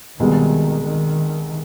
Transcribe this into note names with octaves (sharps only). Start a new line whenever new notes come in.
C2 B2 D#3 G#3
D#3